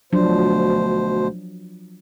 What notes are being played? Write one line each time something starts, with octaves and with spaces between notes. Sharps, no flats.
D2 B2 F3 F#3 D4 C5